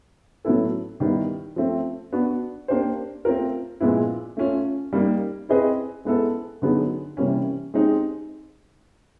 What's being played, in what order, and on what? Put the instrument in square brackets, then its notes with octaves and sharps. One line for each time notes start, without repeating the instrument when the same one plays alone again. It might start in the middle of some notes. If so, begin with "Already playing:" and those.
[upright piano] A2 F#3 B3 E4 A4
D#3 G3 B3 E4
F3 A3 C4
B3 D4 F#4
A#3 D4 G4 C5
A3 C4 F4 A#4
A#2 F3 G#3 B3 E4
A3 C#4 F4
G3 A#3 D#4
C4 E4 G#4 B4 D#5
G#3 B3 E4 A4
D3 F#3 B3 D#4 G#4
C3 E3 G3 A#3 C#4
G#3 C4 D#4 G4